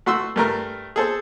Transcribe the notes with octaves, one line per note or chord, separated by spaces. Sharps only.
A3 F#4 C6 E6
G2 A3 A#4 F6
G#4 A4 C5